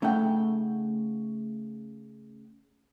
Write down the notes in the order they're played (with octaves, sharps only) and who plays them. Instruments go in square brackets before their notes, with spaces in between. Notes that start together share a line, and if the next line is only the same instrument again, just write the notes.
[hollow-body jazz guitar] C#3 A3 D#4 F#5 G5